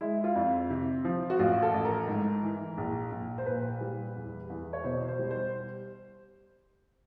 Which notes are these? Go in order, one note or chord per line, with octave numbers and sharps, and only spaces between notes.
G#3 E4
F4
F2
C3
F3
F#4
A1 F4
A4
A1
A#4
G#2
E3
A#1
A#1
C5
A#2 B4
G3
E2
E2
C#5
B2 C5
C5
G3
C5